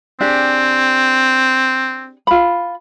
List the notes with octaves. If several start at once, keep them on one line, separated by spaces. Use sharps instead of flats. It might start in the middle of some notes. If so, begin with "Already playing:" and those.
C4 D4 G4 G#4
F4 B5